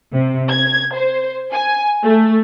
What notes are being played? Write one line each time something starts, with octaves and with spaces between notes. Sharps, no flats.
C3
G#6
C5
G#5
A3